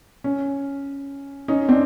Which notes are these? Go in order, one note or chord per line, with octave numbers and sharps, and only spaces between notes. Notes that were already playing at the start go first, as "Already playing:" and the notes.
C#4
C#4 D#4
C4 D4